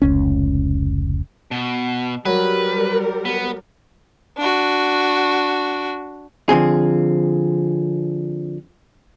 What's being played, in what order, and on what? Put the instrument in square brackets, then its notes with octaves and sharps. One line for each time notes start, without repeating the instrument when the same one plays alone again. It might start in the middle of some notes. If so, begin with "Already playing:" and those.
[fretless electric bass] F1 C#2 C#4
[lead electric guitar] B2
[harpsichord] F#3 [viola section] G3 A#4 [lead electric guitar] B4
[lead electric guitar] B3
[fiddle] D4 F#4
[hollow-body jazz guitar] D3 F3 C4 G#4